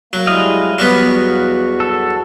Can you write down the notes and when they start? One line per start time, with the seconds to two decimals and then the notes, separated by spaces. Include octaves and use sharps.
0.13 F#3 A#3
0.27 G3 G#3 E4 D#5 F5
0.79 E2 F#3 G3 B3 F#4
1.80 A4